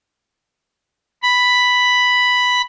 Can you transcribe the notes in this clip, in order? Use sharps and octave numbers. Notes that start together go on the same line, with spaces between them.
B5